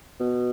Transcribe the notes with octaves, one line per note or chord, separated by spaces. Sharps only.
B2